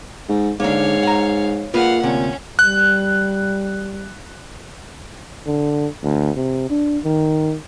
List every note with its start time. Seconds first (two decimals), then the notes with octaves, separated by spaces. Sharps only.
0.29 G#2
0.60 G#2 D3 A#3 C#5 F5
1.03 F#5 A#5
1.74 A#2 F4 G#4 B4 F5 F#5
2.03 D2 C3 C#4
2.59 G3 F#6
5.47 D3
6.04 D2
6.36 C3
6.70 D4
7.04 D#3